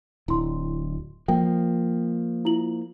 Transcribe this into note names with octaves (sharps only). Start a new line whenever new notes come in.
D1 E4 C6
F3 A#3 G5
E4 F4 F#7